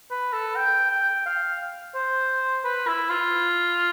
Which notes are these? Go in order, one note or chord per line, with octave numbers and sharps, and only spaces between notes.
B4
A4
G5
G5
F5
C5
B4
E4
F4